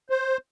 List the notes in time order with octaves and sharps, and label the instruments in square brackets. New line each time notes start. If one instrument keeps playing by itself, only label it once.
[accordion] C5